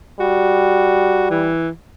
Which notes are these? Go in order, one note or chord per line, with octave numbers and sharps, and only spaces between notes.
G3 F#4
E3